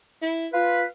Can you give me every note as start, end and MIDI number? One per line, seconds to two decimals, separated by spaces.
0.22 0.47 64
0.53 0.85 65
0.53 0.85 71
0.53 0.86 77